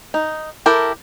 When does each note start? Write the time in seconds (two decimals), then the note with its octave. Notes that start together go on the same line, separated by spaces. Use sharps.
0.14 D#4
0.66 E4 G4 A4 A#4